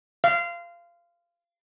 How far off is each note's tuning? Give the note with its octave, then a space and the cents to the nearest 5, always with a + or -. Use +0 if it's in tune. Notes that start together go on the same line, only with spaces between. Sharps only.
F5 -20